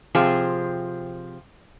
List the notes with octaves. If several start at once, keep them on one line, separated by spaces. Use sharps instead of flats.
C3 F3 C4 G#4